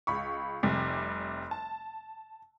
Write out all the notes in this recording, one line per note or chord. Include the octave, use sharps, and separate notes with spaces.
C#2 B5 C#6
F1 C3 G3
A5